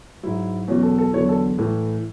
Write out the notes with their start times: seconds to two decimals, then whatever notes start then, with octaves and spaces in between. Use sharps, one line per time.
0.23 G#2 F#3 E4
0.68 E2 B2 F#3 C#4
0.83 A4
0.98 A4
1.13 E2 D3 F#3 C#5
1.29 A4
1.58 A2 E3